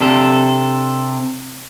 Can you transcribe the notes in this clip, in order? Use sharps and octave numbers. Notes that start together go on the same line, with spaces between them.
C3 D4 A4